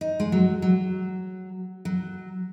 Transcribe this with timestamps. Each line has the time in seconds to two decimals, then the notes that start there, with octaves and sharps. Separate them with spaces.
0.01 D#4
0.20 G#3
0.32 F#3
0.62 F#3
1.85 F#3